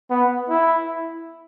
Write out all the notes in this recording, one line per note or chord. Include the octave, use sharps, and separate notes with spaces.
B3
E4